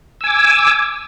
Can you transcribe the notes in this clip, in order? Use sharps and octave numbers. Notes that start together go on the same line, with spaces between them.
G#5 D6 E6